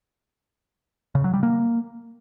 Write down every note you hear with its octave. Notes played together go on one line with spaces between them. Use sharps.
C#3
F#3
G3
A#3